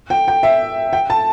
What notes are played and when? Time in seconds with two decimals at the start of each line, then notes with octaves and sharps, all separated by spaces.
0.10 G5
0.28 G5
0.43 E5
0.93 G5
1.10 A5